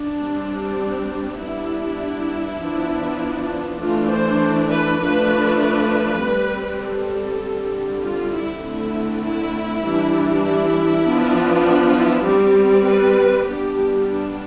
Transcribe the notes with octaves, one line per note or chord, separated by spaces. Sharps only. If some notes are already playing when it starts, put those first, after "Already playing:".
Already playing: D4
G3 C4
G3 B3 D4 E4
F3 B3 D4
E3 A3 D4 F4
C5
B4
F3 A3 D4 B4
B4
G3 C4
A4
D3 G3 C4
F4
E4
D3 A3 C4 E4
E4
E3 G3 D4
E4
F3 B3 D4
E4
G3 C4 G4
B4
G3 B3 D4 G4
D4